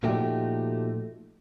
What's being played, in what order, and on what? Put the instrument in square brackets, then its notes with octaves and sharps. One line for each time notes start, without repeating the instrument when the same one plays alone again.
[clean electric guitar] A#2 F3 A3 D#4 F#4 G4